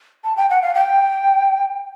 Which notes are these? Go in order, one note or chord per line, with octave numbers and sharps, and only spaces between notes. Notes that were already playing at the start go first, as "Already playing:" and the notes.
A5
G5
F#5
F5
G5